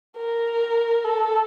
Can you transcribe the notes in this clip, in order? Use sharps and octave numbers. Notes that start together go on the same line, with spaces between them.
A#4
A4